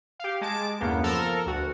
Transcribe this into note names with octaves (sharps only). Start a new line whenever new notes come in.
G4 F5
G#3 A5 D6
E2 G2 C#3 A#3 B3
F3 A4 A#4
D2 F#4